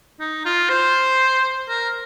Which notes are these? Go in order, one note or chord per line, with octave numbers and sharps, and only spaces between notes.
D#4
F4
C5
A#4